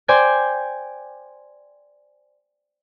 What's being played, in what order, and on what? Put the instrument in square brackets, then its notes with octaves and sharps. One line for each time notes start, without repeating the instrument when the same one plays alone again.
[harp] C5 D5 G5 G#5 G6